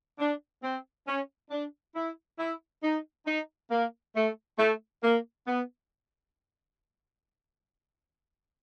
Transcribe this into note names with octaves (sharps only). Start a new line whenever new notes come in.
D4
C4
C#4
D4
E4
E4
D#4
D#4
A#3
A3
A3
A#3
B3